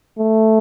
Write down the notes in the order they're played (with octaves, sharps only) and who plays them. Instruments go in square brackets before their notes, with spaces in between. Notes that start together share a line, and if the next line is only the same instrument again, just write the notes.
[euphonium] A3